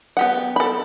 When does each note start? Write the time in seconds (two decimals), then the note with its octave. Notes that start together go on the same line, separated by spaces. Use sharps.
0.17 B3 G4 F#5
0.56 A4 B5